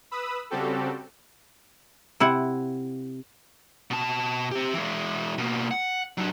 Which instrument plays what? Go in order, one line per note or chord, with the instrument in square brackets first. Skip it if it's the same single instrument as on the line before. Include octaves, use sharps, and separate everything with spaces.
[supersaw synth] B4 B5 D#6 E6
C#3 G3 C4 F#4 G4 A4
[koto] C3 E4 F#5
[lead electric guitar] B2 A5
C4 G4
E3 G#3
B2 A#3
F#5
F#3 D4